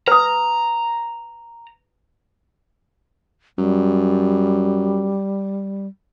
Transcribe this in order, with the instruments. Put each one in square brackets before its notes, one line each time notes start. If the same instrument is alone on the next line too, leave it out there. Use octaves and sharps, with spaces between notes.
[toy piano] B4 D#6 [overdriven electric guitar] A#5
[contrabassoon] F#2 [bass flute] G3